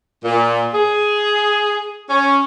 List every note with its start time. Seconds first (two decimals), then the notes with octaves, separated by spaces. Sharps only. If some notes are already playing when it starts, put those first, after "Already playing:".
0.24 A#2
0.75 G#4
2.10 C#4